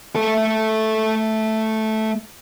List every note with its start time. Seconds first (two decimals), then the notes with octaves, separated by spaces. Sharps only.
0.15 A3 A4